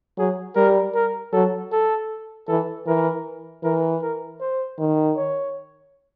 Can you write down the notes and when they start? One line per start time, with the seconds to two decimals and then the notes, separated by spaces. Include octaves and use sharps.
0.18 F#3 G#4
0.56 G3 A#4
0.95 A#4
1.32 F#3 A4
1.72 A4
2.48 E3 A4
2.86 E3 A#4
3.63 E3 A#4
4.02 A#4
4.40 C5
4.79 D#3
5.16 C#5